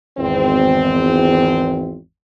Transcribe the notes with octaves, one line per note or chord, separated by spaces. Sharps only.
G#1 E2 C4